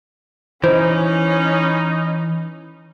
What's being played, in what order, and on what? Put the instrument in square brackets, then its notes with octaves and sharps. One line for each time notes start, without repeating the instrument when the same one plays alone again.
[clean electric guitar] E3 [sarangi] C#4 [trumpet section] D#4 [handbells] C5